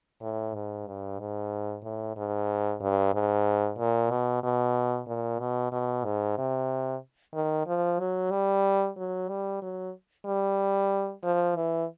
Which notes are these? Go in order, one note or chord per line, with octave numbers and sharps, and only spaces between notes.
A2
G#2
G2
G#2
A2
G#2
G2
G#2
A#2
B2
B2
A#2
B2
B2
G#2
C3
D#3
F3
F#3
G3
F#3
G3
F#3
G3
F3
E3